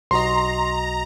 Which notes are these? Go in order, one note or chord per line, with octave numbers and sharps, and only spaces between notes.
B1 F#4 D#5 A#5 C6